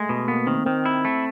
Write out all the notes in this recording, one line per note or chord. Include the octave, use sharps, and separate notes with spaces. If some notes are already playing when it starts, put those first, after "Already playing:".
Already playing: G#3 A3
B2
A#3 B3
D#3 C4
D#3 C4
E4
A3